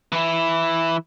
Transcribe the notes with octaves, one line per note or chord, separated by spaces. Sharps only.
E3 E4